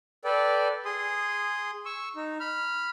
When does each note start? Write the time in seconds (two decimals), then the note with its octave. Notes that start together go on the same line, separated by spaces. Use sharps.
0.24 A4 B4 D5 G5
0.85 G#4 C6 D#6
1.86 C#6 E6
2.16 D#4
2.40 B5 F6